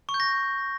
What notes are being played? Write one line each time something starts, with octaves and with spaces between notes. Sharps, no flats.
C#6
G6
A#6